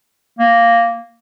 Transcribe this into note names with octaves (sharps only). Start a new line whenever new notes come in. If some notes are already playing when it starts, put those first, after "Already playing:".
A#3